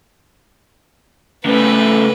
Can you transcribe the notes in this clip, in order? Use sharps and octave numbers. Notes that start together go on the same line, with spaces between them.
C#3 A3 B4